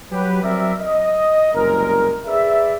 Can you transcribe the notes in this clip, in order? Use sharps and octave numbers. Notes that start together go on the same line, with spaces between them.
F#3 G4 B4
F#3 C4 A#4 D5 E5
D#5
F#1 C2 G#3 A#4
G#4 B4 D5 E5